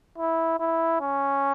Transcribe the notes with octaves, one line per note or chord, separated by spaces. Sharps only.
E4
E4
C#4